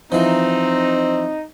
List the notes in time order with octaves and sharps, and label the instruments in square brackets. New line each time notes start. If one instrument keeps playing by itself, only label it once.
[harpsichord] E3 F3 [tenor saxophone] C4 [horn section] D#4